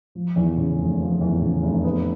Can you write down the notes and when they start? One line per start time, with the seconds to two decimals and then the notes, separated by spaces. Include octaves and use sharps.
0.15 F3
0.36 E2
0.57 C#3
0.79 F1
1.00 F3
1.21 E2
1.42 C#3
1.63 F1
1.84 B3